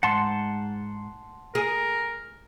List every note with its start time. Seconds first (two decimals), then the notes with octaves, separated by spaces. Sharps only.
0.03 G#2 F#5 A5 C6
1.55 G#4 A#4